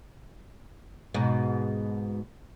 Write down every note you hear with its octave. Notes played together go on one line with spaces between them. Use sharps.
G#2 B2